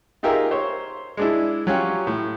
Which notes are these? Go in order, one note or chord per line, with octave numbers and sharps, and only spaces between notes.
D#4 F4 G4 G#4 A#4 E5
C5 C#5
G#3 D4 E4
F#3 C#4 F4 G4
A2